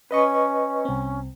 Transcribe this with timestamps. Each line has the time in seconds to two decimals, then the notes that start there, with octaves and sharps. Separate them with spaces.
0.11 C#4 B4 D#5 C#6
0.85 C2 C4